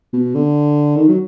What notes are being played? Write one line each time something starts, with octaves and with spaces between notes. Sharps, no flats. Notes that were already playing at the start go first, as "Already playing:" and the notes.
B2
D3
D#3
F#3